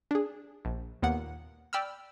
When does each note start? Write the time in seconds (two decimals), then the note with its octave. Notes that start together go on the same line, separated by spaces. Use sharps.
0.11 D4 G#4
0.65 A#1
1.03 D#2 A#2 B3 F#5
1.73 D5 G5 B5 E6 F6